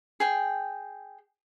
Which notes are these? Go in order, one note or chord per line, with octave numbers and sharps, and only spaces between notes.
G#4 G5